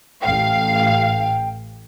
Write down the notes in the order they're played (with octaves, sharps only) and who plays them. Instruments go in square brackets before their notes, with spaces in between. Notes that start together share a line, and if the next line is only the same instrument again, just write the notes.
[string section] A1 F5 [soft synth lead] G5